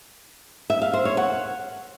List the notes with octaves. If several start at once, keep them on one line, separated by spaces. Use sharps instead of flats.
E5
F5
C5
C#5
F#5